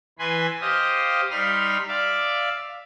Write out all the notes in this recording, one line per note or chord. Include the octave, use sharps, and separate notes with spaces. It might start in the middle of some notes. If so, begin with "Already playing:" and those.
E3 B4 G#5 B5 C6
G4 C5 D#5 F5 D#6
G3 D#4 B5 C6 F6
D5 E5 F5 D6